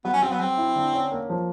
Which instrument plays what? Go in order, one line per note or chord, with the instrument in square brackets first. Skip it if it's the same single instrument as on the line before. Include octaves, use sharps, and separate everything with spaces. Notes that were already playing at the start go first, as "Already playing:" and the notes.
[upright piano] F#3 [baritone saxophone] B3
[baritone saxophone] C#4
[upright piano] F#3 [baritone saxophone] C4
[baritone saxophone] B3
[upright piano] F#3 [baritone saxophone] C4
[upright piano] E4
D3
C#4
A#3
F3